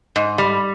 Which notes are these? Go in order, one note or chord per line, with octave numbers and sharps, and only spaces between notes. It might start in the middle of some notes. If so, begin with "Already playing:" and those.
G#2
G3